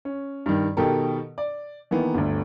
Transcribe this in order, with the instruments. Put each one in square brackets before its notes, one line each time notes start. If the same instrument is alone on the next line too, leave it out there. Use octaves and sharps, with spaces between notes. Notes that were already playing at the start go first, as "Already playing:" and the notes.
[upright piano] C#4
G2 D#3
B2 D#3 G4 A4 A#4
D5
D#3 E3 A#3 B3
G1 D2